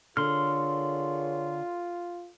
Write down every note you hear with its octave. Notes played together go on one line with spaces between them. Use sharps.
D3 F4 G#4 A#4 C#5 C6 F6